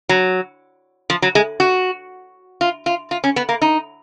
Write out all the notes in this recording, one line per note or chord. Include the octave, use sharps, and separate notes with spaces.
F#3
F3
F#3
G#3
F#4
F4
F4
F4
C#4
B3
A#3
D#4